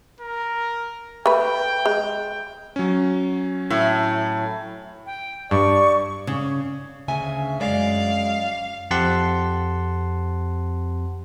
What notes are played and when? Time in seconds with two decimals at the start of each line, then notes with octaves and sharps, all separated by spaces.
0.20 A#4
1.26 A3 B4 G5
1.85 G#3
2.76 F#3 C#4
3.70 A2
5.06 G5
5.51 G2 D5 C#6
6.27 C#3
7.08 D2 C#3 E5 G#5
7.61 F#2 G#3 D5 F5
8.91 F2 C4 G4 F#5 A5 C6